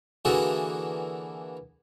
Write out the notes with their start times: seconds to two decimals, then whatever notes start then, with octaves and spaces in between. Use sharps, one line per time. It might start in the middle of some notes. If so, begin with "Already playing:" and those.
0.25 D3 E3 A#3 F#4 G#4 A4